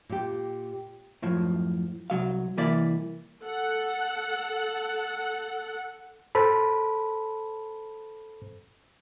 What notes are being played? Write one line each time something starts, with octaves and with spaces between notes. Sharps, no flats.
A#2 G4
F#2 A2 F3
C2 E3 F#3 F5
C2 E3 A#3 E4 D5
A4 F#5
A4 C5 A5 B5